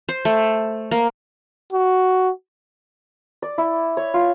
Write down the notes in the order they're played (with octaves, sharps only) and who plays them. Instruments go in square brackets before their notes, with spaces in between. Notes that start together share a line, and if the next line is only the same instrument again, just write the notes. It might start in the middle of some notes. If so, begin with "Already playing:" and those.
[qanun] C5
A3
A#3
[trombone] F#4
[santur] D5
E4
C#5
F4